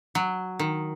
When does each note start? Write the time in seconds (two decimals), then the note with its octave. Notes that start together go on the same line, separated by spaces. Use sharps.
0.15 F#3
0.59 D#3